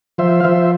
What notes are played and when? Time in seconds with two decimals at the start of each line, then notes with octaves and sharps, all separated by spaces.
0.18 F3 C5 E5
0.40 F5
0.44 F3 C5 E5